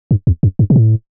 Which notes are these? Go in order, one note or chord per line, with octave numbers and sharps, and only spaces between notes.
G2
E2
F#2
G2
B2
A2